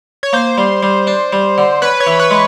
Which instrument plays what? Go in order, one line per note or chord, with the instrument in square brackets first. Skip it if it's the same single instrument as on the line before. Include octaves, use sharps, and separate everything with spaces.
[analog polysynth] C#5
[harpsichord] A#3 [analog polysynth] C5
[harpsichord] G3
G3
D4
G3
D3
[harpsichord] C#4 [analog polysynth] B4
[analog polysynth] C#5
[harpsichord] E3
[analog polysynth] B4
[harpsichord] G#3